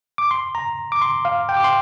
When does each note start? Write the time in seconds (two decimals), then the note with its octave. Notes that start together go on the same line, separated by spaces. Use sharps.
0.18 D6
0.31 C6
0.55 A#5
0.92 D6
1.02 C6
1.25 F5
1.49 G5
1.57 D6
1.64 C6